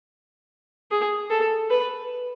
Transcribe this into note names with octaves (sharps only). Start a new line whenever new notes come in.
G#4
A4
B4